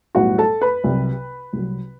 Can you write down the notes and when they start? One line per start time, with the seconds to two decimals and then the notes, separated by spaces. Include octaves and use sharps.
0.15 B1 A2 G3 B3 F#4 F#5
0.38 A4 A5
0.61 B4 B5
0.84 C2 C3 F#3
1.53 C2 C3 F#3